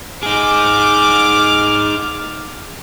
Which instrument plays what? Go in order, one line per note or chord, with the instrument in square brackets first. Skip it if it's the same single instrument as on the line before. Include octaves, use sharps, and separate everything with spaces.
[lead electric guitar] D#4 G#4 [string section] D6 [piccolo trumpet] F6